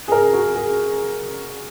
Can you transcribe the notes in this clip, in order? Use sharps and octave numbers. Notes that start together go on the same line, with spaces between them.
G#4
A#4
F#4
G#4